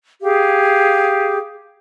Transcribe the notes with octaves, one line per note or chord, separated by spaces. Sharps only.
G4 G#4 F5